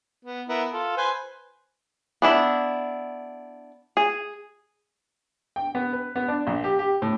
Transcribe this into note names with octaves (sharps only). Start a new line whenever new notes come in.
B3
B3 E4 A#4
F4 A4
B4 C5 G#5
B3 D4 E4
G#4
G5
B3
B4
B3
D4
A#1
G4
G4
A2